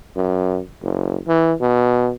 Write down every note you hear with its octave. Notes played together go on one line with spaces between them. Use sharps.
F#2
F#1
E3
B2